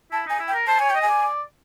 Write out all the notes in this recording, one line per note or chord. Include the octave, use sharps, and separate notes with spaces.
E4 A5
D#4 G#5
E4
G5
A#4
C5 A5
C#5 G#5
D#5 G5
G#5
D5
D5